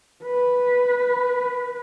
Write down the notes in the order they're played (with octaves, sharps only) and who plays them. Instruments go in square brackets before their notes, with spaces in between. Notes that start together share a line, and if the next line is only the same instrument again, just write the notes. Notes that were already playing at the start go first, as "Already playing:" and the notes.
[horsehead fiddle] B4